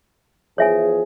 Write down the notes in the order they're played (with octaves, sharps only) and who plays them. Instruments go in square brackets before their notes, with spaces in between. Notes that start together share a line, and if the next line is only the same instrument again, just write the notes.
[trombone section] E2 F3 G#4 [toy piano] C#5 E5 G#5